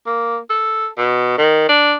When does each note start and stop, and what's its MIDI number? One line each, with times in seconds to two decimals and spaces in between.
0.06 0.38 58
0.50 0.88 69
0.98 1.34 47
1.38 1.66 51
1.69 1.95 62